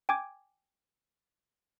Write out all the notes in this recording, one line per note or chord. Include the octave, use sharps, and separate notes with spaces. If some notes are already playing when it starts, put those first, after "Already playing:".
G5 G#5 D6 G#6